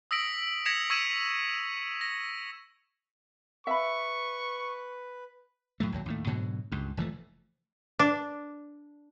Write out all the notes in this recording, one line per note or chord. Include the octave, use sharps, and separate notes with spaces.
D#6 E6 A#6 B6 D7 F#7
G#6 A#6 B6 C#7 E7 F7
C#6 E6 G#6 B6 D#7 E7
A#6
B4 E5 F5 B5 C#6
A2 F#3 A3
A#1 D#2 F#3
D#2 A2 A3
G#2 B2 D3 F#3
C#2 G2
F1 E3 F3 A3
D4